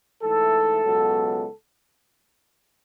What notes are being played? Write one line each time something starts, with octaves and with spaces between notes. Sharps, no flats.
G#2 E3 A3 A4
C#2 B2 F#3 B3